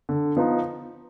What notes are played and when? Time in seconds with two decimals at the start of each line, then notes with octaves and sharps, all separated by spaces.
0.09 D3
0.36 F3 B3 D#4